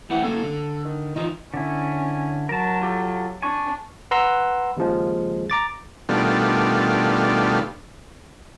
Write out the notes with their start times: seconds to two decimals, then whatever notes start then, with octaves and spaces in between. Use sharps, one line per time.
0.10 E3 A3 F#5 G5
0.24 F#3 A#3 C#4 A4
0.44 D3
0.85 D#3
1.16 D#3 E3 D#4 F4
1.54 D3 C#4 E4
2.49 F#3 A#4 A5
2.81 F4 G4 A4
3.42 D4 G#5 C#6
4.11 B4 F#5 A#5 C6 E6
4.77 D#2 C#3 F3 G#3
5.50 A#5 D6 A6
6.09 B2 D#3 G3 A3 D4 F4